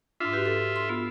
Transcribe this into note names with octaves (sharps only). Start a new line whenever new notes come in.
G#2 D4 F4 E5
F#4 G4 B4
A4
C6
B3